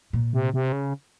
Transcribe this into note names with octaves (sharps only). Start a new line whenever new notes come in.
A#2
C3
C3
C#3